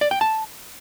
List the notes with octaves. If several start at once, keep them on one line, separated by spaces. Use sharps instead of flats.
D5
G5
A5